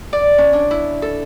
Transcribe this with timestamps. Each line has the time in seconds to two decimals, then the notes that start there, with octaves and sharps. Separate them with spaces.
0.13 D5
0.38 C#4
0.53 D4
0.71 E4
1.02 A4